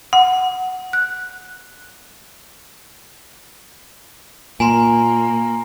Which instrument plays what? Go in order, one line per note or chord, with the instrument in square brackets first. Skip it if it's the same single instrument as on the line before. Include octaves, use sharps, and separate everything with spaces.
[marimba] F#5
F#6
[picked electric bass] A#2 [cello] A#3 [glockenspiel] G#5 A#5 C6